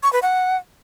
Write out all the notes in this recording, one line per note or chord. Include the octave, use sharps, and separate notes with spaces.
C#6
B4
F#5